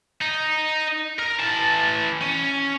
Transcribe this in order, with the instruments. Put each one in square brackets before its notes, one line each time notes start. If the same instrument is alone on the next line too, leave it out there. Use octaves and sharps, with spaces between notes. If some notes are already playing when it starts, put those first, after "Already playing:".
[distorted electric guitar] D#4
A#4
E3 A5
C#4